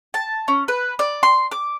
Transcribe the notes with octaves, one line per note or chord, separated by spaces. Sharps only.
A5
C#4
B4
D5
C6
D6